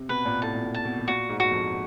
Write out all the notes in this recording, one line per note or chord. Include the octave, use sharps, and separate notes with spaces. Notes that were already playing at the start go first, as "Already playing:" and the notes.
Already playing: C3
B2 B4
A#2
A2 A5
A#2
B2
A5
B2
B2
A#2 F#4
G#2
F#4
F2